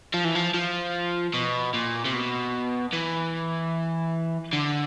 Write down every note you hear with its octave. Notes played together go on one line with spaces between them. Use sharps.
F3
E3
F3
F3
B2
A#2
C3
B2
E3
D3